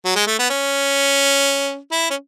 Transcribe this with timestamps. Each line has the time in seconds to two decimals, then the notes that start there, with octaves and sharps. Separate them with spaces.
0.05 F#3
0.15 G#3
0.27 A3
0.39 B3
0.49 C#4
1.91 E4
2.10 C#4